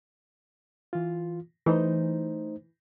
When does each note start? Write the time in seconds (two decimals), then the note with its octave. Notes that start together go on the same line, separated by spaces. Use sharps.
0.93 E3 F4
1.66 E3 A3 D#4 C5